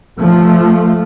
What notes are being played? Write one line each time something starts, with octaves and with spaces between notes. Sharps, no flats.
F3 A3